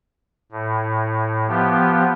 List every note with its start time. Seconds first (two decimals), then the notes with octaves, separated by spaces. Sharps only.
0.52 A2
1.48 F3 B3 G4